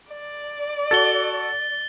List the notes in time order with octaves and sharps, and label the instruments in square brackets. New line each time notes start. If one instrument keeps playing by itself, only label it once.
[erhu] D5
[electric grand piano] F#4 A4 [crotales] A6 G7